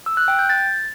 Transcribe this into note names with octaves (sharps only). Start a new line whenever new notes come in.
E6
F#6
G5
G6
A6